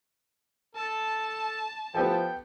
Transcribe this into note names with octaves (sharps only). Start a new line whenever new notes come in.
A4 A5
F3 B3 G4 A4 G5